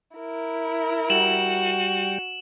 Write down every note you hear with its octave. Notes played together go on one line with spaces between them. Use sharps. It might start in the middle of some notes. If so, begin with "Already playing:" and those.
E4 A#4
G3 F#4 G5 E7 F#7